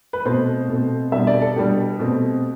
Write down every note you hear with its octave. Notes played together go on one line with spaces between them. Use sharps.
B4
B2 A3 C4 C5
B2 A3 C4
B2 G3 B3 D4 E5
D5
A4
B2 G3 B3 D4 G4
B2 A3 C4